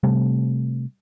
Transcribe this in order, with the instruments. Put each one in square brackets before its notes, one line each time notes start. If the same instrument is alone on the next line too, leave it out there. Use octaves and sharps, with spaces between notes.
[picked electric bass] C3 G3 A3 C4